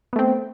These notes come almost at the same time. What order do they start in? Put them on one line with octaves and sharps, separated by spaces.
B3 A3 C4